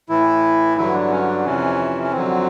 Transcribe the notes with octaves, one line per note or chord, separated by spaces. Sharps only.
A2 E3 E4
G2 D3 F#3 E4
D4
C#4
D4
F2 C3 E3 C#4
C#4
F2 D3 F#3 C4